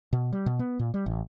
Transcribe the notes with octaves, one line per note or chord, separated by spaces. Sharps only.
B2
G3
B2
B3
A#2
G3
A1